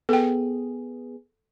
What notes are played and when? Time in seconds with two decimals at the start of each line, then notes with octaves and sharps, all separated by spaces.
0.09 B3 G#4 A4 G5